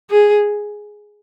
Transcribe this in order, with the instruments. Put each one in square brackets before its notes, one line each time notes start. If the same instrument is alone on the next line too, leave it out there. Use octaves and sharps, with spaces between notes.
[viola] G#4